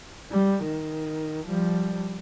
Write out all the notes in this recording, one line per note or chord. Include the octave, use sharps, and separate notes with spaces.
G3
D#3
F3 G3